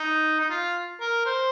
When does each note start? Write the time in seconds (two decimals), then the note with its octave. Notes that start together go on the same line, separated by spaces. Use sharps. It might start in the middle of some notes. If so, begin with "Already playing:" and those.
Already playing: D#4
0.40 D#4
0.50 F4
1.01 A#4
1.26 C5